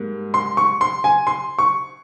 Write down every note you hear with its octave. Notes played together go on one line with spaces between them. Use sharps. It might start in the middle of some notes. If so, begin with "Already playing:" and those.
Already playing: G#2 G3 A#3
C6
C#6
C6
G#5
C6
C#6